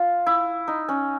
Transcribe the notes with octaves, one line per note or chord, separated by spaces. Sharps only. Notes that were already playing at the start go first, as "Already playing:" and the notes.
Already playing: F4
E4
D#4
C#4